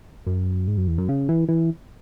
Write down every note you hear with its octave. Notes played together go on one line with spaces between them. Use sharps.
F#2
G#2
F#2
E2
F#2
C#3
E3
E3